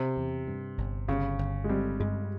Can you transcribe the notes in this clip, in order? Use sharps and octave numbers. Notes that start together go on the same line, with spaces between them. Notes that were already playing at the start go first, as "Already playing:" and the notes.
Already playing: C3
E2
G2
G1
G1 C#3
G1
G#3
G3 C4
G2 G#3